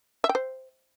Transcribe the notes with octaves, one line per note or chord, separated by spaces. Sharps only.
E5
G5
C5